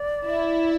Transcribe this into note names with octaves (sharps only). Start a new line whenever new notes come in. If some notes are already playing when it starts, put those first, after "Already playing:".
Already playing: D5
E4